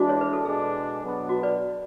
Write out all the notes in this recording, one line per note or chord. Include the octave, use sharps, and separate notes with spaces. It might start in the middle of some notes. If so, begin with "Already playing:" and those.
Already playing: E3 G#3 D4 F#4
C#5
B4
A4
B2 G#3 D4 G#4
B2 F#3 B3 D4
F#4
B4 D5